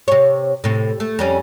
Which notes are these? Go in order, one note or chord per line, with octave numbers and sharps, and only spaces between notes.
C3 C#5
A2 C3
A3
F2 G3 C#4